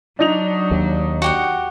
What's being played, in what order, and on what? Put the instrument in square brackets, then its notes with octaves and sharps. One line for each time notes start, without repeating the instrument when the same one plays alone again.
[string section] F#3 [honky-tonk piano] D4 D#4 F7
[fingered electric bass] D#2
[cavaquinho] F#4 G4 F#5